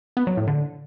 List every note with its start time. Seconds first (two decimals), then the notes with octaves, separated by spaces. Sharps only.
0.17 B3
0.27 F#3
0.37 A2
0.47 D3